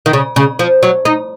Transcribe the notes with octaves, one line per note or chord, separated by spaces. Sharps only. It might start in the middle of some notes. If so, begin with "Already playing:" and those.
D#3
C#3
C#3
F3
F#3
D#4